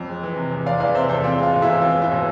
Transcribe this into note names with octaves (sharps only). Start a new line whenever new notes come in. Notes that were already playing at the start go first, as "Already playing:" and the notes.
Already playing: F2
G#3
E3
C3
E2
G#3 D5 F5
E3 D5 F5
C3 C5 E5
E2 A4 C5
C4 F4
G#3 F4
B2
E4 G#4
E2
C4 F4
G#3
E4
B2